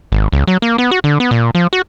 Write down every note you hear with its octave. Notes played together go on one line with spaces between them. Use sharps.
G#1
C#2
F#3
A#3
B3
F#4
D3
B3
A#2
F3
F#4